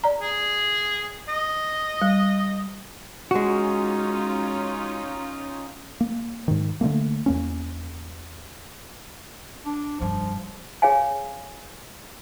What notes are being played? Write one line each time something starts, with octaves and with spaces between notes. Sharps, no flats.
D5 A#5
G#4
D#5
G3
G#3 C#4 D#4 F4 F#4
A#3
G#2 D#3
D3 E3 A3 A#3
E2 A#3 C#4
D4
F1 G2 F3
G#4 C#5 F5 G#5